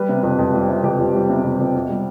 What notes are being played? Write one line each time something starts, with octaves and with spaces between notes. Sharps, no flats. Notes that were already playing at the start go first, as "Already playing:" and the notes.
Already playing: G3 B4
C3
F2
F2
G3
C3
F2 G4
F2
G3
C3
F2
F2
B2
G3